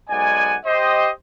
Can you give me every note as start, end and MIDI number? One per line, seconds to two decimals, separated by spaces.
0.10 0.55 35
0.10 0.55 56
0.10 0.55 74
0.10 0.55 78
0.10 0.55 80
0.66 1.10 67
0.66 1.10 72
0.66 1.10 75